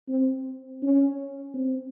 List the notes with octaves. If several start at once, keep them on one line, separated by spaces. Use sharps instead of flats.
C4
C#4
C4